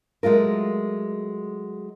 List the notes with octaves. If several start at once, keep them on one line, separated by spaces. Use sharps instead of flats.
F#3 G#3 A3 F4 A#4